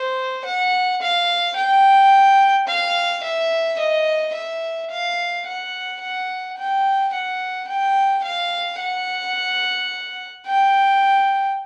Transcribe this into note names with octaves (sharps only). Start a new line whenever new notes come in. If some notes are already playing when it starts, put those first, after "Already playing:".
Already playing: C5
F#5
F5
G5
F5
E5
D#5
E5
F5
F#5
F#5
G5
F#5
G5
F5
F#5
G5